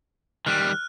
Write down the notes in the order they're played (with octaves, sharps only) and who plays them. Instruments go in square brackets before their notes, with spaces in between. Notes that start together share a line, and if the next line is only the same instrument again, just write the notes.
[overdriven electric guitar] D#3 G3 [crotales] F6 F#6